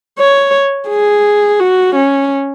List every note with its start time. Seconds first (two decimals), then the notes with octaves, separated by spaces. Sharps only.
0.19 C#5
0.89 G#4
1.60 F#4
1.96 C#4